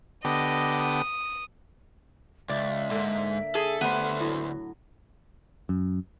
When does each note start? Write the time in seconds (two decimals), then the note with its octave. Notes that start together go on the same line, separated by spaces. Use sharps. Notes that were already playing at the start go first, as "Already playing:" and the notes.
0.25 D3 B3 G4 D#5
0.82 D#6
2.49 C#2 D5 E5
2.91 G#2 D3 A#3
3.55 G#4 A4
3.81 D2 A3 B3 G4 C5
4.20 A2 F#3
5.69 F#2